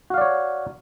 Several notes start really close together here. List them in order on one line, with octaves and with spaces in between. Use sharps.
F#4 F5 D5 C#5